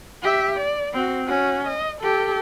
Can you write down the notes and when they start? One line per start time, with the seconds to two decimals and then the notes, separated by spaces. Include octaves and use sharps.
0.23 G4 E5
0.57 D5
0.93 C4 F#4
1.26 C#4 F#4
1.67 D#5
2.01 G4 A4